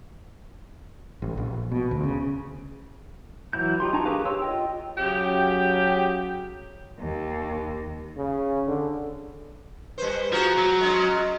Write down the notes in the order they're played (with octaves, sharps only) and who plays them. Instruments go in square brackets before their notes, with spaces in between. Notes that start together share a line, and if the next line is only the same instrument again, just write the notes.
[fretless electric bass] A1
A#1
B2
D2
C#3
[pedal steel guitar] E3 F#3 E4 G6
D#4 F4 G4 C6
D4 D#4 G#5 A#5 C#6
G4 G#4 A#4 B4 F5
G4 C#5 C6 E6
F4 D#5 G5
[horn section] C#3 G4 [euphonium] F#3
[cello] D#2
[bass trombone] C#3
D3
[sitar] G3 C5 [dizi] B4
[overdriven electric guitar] F3 [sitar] F#4 G#4 [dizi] A#5
[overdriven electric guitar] F#3
[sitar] G#3 C#4